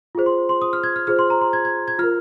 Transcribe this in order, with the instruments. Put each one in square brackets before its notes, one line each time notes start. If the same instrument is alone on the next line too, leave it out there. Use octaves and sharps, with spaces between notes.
[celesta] F4 G#4 C5
C6
C6
D#6
F6
G#6
F6
F4 G#4 C5 F6
C6
A#5
C6
G#6
G#6
G#6
F4 A#4 F6